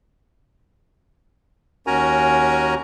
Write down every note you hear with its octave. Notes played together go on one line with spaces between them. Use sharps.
D#2 C#4 F#4 A#4 G#5 A#5